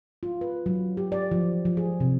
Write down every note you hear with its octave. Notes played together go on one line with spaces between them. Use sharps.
F4
B4
F#3
G4
D5
F3
F3
G#4
C3